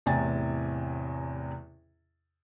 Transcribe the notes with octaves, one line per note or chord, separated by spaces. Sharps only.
A1 E2 C3 G#5 A6